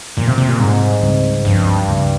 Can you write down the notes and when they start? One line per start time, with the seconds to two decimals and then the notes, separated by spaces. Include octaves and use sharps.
0.17 F2 A#2 D#3 A#3
0.27 C3
0.38 C3
0.48 A#2
0.59 G#2 C3 G3 C4
1.02 C#2 C#3 G3 C4
1.44 C#2 G2 C#3 F3 C4
1.88 C#2 C#3 G3